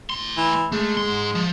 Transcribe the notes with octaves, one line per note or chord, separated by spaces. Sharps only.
A2 C6
E3
G#3 A3
G#2 C6
F3